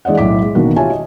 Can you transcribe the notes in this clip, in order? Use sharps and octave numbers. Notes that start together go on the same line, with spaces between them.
E3 G#3 D5 D#5 F#5
B1 A2 D6 B6
G#3
A1 B2 D#3 A#3 F#4
F4 G4 C#5 E5 G#5 A5
D#5